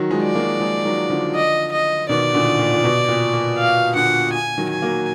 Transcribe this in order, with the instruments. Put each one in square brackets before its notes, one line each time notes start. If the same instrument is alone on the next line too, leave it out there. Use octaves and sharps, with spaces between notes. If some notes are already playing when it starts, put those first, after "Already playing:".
Already playing: [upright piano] D#3 F#3
F3 G#3
[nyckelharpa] D5
[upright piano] F#3 A#3
F3 G#3
D#3 F#3
D3 F3
[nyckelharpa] D#5
D#5
[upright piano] B2 D#3 [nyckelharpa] D5
[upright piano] A#2 D3
A#2
A#2
B2
A#2
A#2
[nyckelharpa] F5
[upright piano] A#2 D3 [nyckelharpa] F#5
[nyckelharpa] G#5
[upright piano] D#3 F#3
[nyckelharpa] G#5
[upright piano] F#3 A#3